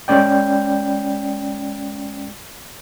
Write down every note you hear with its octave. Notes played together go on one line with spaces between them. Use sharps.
G#3 C#4 D5 G5